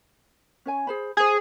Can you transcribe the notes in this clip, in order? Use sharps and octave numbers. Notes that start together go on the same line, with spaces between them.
C#4 C#5 G#5
G#4 C5 B5
G#4 C5 G#5